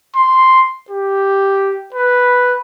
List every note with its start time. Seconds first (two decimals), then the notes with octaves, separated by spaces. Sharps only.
0.16 C6
0.90 G4
1.94 B4